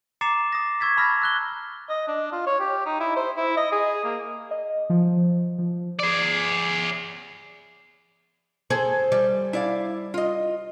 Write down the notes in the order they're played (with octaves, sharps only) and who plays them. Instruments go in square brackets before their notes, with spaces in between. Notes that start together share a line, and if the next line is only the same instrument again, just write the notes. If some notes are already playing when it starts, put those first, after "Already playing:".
[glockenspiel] A#5 D6 A6 C7 C#7 E7
D#6 A#6
C#6 E6 G#6 A6 B6
A5 B5 E6 F6 A#6
E6 F#6 G7
[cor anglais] D#5
D4
F4
C#5
G4
D#4
E4
C5
E4
D#5
G#4
A#3
[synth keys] D#5
F3
F3
[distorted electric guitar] G#4 D5
[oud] G#4 C5 [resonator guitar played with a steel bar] A4
[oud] G3
[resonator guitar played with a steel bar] E4 D5 F5
F4 D#5